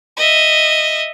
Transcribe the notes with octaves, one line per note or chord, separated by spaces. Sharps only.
D#5 E5